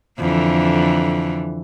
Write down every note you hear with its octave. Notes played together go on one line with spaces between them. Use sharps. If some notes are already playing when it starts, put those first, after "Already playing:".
F2 D3 E3